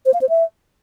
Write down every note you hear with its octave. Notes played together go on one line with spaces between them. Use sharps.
C5
F5
C5
E5